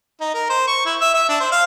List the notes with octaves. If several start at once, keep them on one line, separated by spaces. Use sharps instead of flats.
D#4
A#4
C5
C#6
E4
E5
E5
D4
C5
F5